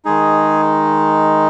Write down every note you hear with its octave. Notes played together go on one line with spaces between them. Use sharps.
D#3 G#3 D#4 G#4